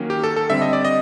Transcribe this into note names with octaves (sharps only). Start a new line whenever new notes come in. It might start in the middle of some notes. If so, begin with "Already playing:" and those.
Already playing: D#3 F#3 A#3 C#4
G4
A4
A4
D3 G3 C4 E5
D#5
D5
D#5